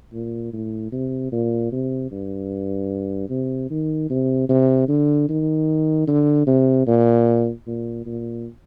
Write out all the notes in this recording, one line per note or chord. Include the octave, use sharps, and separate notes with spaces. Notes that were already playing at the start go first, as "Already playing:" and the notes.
A#2
A2
C3
A#2
C3
G2
C3
D#3
C3
C3
D3
D#3
D3
C3
A#2
A#2
A#2